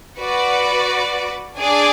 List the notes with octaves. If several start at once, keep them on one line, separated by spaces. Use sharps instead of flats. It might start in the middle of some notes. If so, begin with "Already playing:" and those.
F#4 B4 D5
D4 G#4 D5 G#5